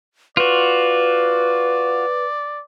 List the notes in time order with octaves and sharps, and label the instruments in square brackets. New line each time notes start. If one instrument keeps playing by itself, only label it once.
[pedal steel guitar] F4 F#4 [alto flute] B4 [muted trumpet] D5